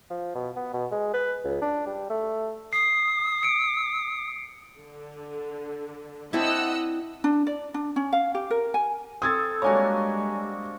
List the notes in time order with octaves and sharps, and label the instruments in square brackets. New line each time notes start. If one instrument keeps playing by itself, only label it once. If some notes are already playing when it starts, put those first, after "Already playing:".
[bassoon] F3
B2
B3
B2
G#3
B4
C#2
D4
G3
A3
[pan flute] D#6 [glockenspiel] C7
[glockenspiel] C#7 D7
[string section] D3
[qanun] C4 D4 E4 [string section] D#5 F#5 E6
[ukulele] D4
D5
D4
C#4
F5
G4
A#4
G#5
[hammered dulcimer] C4 A4 [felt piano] D#6 G#6 A6
[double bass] G3 G#3 [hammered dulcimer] A#3 D4 F#4 [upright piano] C#5 G#5